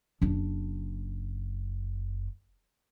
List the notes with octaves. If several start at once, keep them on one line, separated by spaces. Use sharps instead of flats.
F#1 D4